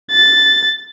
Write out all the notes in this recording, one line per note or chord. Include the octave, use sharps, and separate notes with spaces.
A6